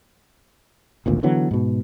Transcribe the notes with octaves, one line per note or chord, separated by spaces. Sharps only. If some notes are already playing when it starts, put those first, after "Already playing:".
G#1 D2 A#2
D3 E3 F#3 B3
G#2 B2